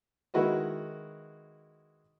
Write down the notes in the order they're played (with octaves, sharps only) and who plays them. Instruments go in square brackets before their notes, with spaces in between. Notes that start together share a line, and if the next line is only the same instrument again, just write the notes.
[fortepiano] D#3 G#3 E4 F#4 B4 D#5